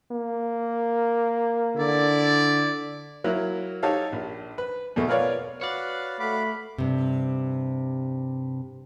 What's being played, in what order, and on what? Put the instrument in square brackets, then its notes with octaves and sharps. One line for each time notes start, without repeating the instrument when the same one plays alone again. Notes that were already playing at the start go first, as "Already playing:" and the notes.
[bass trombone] A#3
[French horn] D3 [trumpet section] E4 D5
[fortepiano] F#3 A#3 E4
D#4 G4 A4 C#5 F5
A#1
B4
E2 B2 A3
F4 A#4 B4 C#5 D5 F5
[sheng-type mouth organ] F#4 B4 F5 [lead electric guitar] C#5 D5
[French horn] A3 [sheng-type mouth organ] F#4 F5 D6 [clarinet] B5
[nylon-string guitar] G2 C3